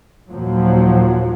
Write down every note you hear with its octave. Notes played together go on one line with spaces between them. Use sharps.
D#2 A#2 F3 F#3